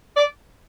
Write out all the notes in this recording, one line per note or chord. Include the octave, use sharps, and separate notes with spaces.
D5